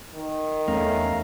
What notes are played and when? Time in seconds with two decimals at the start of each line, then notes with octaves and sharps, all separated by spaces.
0.15 D#3
0.68 E2 A3 C#4 F5 A#5